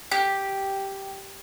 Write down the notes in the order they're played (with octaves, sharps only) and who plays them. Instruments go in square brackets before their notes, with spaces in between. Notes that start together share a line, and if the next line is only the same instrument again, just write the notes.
[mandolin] G4